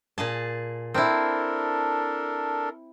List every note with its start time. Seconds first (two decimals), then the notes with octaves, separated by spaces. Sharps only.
0.18 A#2 G#4 A5
0.94 C4 D4 E4 A4 A#4